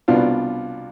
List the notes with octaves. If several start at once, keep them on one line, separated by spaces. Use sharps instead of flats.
C2 B2 B3 D4 F4